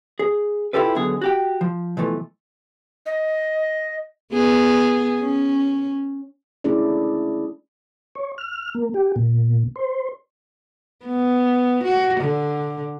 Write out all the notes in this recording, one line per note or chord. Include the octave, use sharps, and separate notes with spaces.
G#4
E4 F4 G4 A4 B4
B1 B2 D3 G#4
F#4 G4 G5
F3
B2 E3 F3 A3
D#5
B3 G#4
C#4
A3 C#4 D4 E4 G#4 D5
C#5
F6
A#3
G4
A#2
C5
B3
F#4
D3